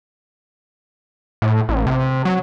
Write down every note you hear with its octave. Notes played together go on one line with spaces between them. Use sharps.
A2
A1
C3
F#3